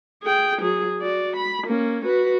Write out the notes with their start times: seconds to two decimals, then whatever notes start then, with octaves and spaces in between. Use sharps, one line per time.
0.23 G#4 G5
0.61 F#3 G#4
1.00 F#4 D5
1.36 B5
1.67 A#3 C#4
2.05 F#4 B4